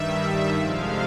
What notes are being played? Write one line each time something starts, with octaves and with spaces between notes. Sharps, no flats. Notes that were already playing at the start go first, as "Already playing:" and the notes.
Already playing: G2 D#3 G3 E5
F2 C3 F3 G#3 F5